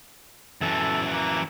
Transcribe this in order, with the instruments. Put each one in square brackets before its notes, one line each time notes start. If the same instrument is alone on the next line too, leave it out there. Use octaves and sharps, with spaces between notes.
[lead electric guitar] F#2 E3 [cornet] A4
[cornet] A#3